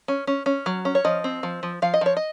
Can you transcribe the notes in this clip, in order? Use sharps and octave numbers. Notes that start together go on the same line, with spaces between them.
C#4
C#4
C#4
F#3
C#4
C#5
F3 D#5
C4
F3
F3
F3 F5
D#5
F3 C#5
D#5